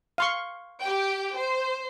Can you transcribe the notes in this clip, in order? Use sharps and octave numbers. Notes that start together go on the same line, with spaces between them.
F5 C6 C#6
G4 G5
C5